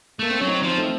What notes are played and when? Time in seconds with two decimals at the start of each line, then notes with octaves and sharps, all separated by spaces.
0.19 A3 A#3
0.31 C4
0.40 F#3 C#4
0.48 C4 D#4
0.63 F3
0.77 A3 C4